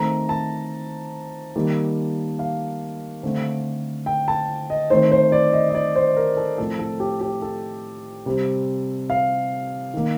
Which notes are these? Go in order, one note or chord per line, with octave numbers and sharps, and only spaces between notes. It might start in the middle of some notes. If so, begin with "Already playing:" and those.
Already playing: D#3 A3 C4 A#5
A5
D#3 G3 A#3
F5
D3 A3 C4
G5
A5
D#5
D#3 A3 C4 C5
C5
D5
D#5
D#5
D5
C5
A#4
A4
A2 F3 C4 A4
A4
G4
G4
A4
C3 G3 C4
F5
D#3 A#3